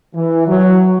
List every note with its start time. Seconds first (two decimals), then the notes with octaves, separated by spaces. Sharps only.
0.15 E3
0.48 F#3